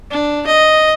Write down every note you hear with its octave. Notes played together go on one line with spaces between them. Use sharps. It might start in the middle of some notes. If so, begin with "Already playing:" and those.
D4
D#5